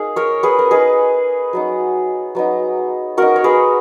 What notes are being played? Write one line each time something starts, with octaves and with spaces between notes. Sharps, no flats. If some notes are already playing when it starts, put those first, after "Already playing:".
Already playing: A#3 D#4 G#4
A#4 C#5
G#4 B4
A#4
A#3 D#4 G#4 B4
F#3 B3 D#4
F#3 B3 D#4
A#3 D#4 F#4 A#4
C#5
G#4 B4